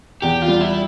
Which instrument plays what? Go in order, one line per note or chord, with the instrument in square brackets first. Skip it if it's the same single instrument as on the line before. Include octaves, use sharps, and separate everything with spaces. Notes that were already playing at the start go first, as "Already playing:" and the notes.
[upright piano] E2 [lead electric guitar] G4
[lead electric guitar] F4
[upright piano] G3
[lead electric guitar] E4